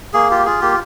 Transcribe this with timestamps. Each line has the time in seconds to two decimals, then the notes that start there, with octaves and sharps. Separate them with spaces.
0.14 A#3 G#4
0.30 F4 G4
0.46 F4 G#4
0.61 A#3 G4